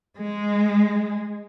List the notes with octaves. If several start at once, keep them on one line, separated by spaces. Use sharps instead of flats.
G#3